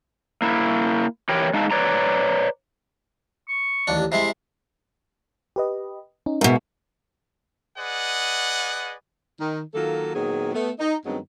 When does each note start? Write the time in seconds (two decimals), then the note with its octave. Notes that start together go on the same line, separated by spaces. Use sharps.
0.42 A#3 E4
1.29 E3 G4 A#4 B4 C#5 G5
1.54 G#3 D#4 F5 A5
1.71 B4 C#5 D5 A#5
3.49 C#6
3.87 A1 D#2 D4
4.12 C3 G#3 E4 C6
5.56 G4 B4 D#5
6.26 C#4 D#4
6.41 G#2 B2 A#4 E5 B6
7.78 G#4 B4 D5 D#5 F#5
9.40 D#3
9.74 D#3 F#3 A#3 F4 A4
10.14 A#2 D#3 F#3 B3 G#4
10.53 A3 B3
10.79 D#4
11.05 G2 D#3 F#3 G#3 B3 C4